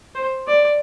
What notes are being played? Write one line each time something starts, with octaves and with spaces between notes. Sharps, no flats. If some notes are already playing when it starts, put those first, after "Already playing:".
C5
D5